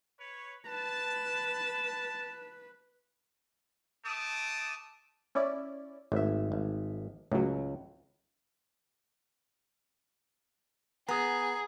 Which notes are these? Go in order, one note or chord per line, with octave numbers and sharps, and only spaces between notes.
B4 C#5
B4 A5
A3 A5 D6 D#6
C#4 E4 D5
G#1 A2 E5
G#1
C#2 A2 F#3
B3 G#4 A#5 D#6